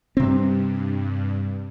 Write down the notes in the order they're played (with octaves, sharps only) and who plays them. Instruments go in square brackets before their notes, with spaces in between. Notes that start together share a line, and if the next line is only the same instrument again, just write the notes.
[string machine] G2 [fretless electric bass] C3 C4